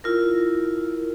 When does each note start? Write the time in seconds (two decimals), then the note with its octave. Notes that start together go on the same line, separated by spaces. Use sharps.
0.04 E4 F4 A#4